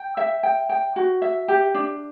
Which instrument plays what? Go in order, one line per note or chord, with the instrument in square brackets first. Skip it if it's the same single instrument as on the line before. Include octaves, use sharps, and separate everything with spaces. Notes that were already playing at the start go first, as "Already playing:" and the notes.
Already playing: [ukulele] G5
E5
G5
G5
F#4
E5
G4
D4